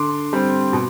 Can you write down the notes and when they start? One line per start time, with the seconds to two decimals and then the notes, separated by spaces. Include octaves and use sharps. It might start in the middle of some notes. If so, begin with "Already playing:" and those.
Already playing: D3 C6 D6
0.33 G3 C4
0.73 B2